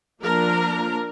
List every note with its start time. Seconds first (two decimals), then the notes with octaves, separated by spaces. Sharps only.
0.22 F3 A#3 D4 A#4